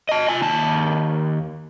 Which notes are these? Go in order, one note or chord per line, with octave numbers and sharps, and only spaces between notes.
D#5 A5
F4 G#5
D#2 A5